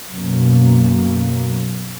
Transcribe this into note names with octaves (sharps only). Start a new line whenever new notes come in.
B1 F#2 B2 A#3